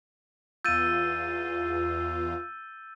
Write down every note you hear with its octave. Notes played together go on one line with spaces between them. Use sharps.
E2 F4 E6 G6 A6 D#7